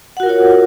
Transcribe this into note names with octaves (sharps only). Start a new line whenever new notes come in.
F4 F#4 A#4 C#5 F#5